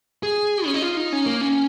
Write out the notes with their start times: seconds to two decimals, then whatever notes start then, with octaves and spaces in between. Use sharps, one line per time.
0.23 G#4
0.66 C#4
0.74 D#4
0.82 F4
0.97 D#4
1.12 C#4
1.26 A#3
1.41 C#4